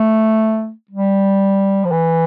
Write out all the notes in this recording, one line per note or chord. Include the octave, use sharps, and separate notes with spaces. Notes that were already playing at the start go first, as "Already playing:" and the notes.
Already playing: A3
G3
F3
E3